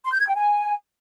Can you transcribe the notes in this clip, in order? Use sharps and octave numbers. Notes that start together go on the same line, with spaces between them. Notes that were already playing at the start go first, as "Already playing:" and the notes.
C6
G6
G#6
G5
G#5